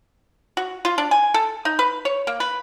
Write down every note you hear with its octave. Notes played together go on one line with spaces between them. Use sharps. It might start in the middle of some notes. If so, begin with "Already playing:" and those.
F#4
F4
D4
G#5
A4
D#4
B4
C#5
A#3
B4